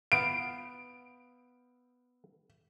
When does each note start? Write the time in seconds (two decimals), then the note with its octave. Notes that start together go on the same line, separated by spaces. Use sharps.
0.12 B3 F5 D7